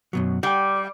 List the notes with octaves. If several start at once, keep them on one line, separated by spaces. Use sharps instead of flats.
F#2 B2 F#3
G3 F#5 G5